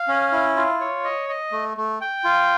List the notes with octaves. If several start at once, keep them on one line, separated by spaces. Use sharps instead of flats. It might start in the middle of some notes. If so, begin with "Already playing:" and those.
Already playing: F5
C#4
E4
F4
C#5
D#5
D#5
A3
A3
G5
F4